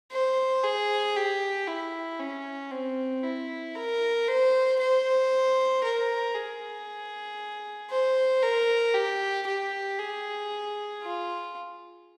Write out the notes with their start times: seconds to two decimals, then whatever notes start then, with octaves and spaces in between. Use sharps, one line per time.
0.12 C5
0.64 G#4
1.16 G4
1.68 E4
2.20 C#4
2.72 C4
3.23 E4
3.76 A#4
4.28 C5
4.79 C5
5.84 A#4
6.35 G#4
7.91 C5
8.43 A#4
8.95 G4
9.47 G4
9.99 G#4
11.03 F4